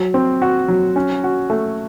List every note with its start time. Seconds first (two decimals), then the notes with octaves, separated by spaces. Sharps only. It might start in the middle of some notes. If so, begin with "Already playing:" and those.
Already playing: F#3
0.14 C4
0.42 F#4
0.68 F#3
0.96 C#4
1.24 F#4
1.50 A3